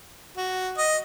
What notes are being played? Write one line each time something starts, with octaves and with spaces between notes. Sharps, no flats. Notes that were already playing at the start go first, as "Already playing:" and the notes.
F#4
D#5